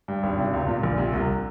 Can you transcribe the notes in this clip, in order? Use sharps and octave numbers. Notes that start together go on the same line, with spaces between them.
G2
G#1
C3
C#2
A#2
A#1
C3
C2